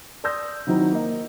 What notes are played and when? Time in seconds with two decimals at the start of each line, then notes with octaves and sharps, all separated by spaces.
0.24 D5 C6 D#6 E6 G6 A#6
0.67 D#3 F#3 C4 D#4 E4
0.92 A#3 D#5